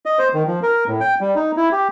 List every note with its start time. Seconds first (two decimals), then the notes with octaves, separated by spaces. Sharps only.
0.06 D#5
0.19 C5
0.34 D#3
0.47 F3
0.63 A#4
0.88 A2
1.01 G5
1.20 G3
1.36 D#4
1.57 E4
1.72 G4